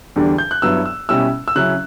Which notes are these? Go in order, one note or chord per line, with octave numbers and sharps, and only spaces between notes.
E2 D3 G3 D4
G6
F#6
G2 F#3 B3 E4 E6
E6
B2 G3 C#4 E4 E6
E6
C#3 F#3 C#4 E4 F#6